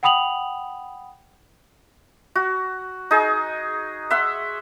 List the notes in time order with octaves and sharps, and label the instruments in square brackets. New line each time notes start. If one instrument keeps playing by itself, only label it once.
[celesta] F#5 G5 B5 D#6 F7 F#7
[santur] F#4
D#4 G#4
E5 F#5 C6